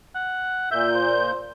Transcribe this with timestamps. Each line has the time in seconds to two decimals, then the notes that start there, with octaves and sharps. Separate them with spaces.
0.15 F#5
0.71 A#2 E5 G6
0.95 C5